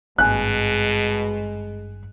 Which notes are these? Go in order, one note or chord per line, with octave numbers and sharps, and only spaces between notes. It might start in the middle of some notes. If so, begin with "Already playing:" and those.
G#1 G2 B2 G#3 G#5 F#6